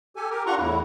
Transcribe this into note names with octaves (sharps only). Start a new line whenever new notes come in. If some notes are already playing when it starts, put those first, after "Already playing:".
G4 A4 G#5
G4 A#4
D4 F4 F#5 A#5 C6 C#6
E2 A2 E4